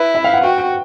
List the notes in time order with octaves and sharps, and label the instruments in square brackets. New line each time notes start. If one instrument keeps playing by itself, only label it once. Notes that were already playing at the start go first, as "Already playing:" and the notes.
Already playing: [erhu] E4 [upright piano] B4
[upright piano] E5
F5
F#5
[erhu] F#4 [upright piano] G5
[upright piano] G5